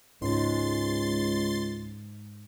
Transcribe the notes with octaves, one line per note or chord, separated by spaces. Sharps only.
C#2 G#2 C6 A6